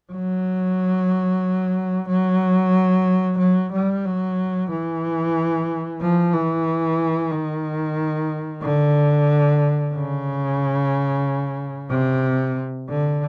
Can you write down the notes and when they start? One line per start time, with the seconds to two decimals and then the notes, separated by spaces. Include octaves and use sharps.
0.12 F#3
2.09 F#3
3.38 F#3
3.72 G3
4.05 F#3
4.71 E3
6.02 F3
6.33 E3
7.31 D#3
8.62 D3
9.94 C#3
11.90 C3
12.89 D3